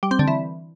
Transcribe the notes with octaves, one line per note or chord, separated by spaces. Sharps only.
G3
C4
D3
E3